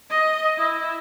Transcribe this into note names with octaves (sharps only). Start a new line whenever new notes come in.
D#5
E4